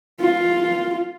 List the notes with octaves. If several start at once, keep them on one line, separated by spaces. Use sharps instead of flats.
F4